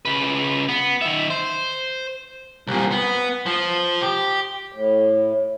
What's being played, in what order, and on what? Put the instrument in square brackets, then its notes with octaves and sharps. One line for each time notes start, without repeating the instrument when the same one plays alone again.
[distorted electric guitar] C#3 B4
B3
D#3 E5
C5
[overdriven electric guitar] C2 A#2
B3
F3
G4
[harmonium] A2